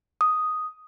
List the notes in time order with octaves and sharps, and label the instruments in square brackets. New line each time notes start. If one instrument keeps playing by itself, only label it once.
[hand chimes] D#6